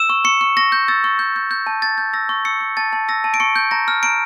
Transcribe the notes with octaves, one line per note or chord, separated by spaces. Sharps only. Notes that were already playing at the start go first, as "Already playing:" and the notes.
Already playing: E6 E7
C#6
C#6 C#7
C#6
C#6 A#6
G6
E6 A6
C#6
C#6 G6
G6
G6
A5
A5 A6
G6
E6 A#6
C#6
E6 C#7
C#6
A5 A6
A5
E6 A#6
A5
D7
C#6 C#7
G6
A#5 A#6
F6
A#5 D7